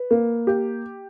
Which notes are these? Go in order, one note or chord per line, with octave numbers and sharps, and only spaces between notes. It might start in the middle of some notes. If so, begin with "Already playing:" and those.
Already playing: B4
A#3
G4